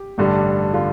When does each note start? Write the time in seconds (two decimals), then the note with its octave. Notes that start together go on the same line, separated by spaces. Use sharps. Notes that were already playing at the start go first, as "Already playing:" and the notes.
Already playing: G4
0.18 A1 G2 D3 G3
0.74 D3 G3 F4